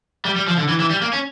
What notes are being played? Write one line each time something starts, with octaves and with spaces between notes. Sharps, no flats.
G3
G3
F3
D3
E3
E3
G3
A#3
C#4